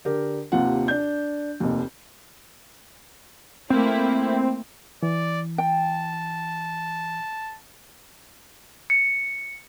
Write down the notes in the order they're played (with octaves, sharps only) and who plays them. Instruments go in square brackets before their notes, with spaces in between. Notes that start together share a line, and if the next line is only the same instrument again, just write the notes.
[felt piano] D3 G4 A#4
D#2 C3 F4 F#5
D4 G6
F1 D#2
[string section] A3 A#3 E4 [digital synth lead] C4
[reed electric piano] E3 [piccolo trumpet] D5
[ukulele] G5 [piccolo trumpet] A5
[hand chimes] C#7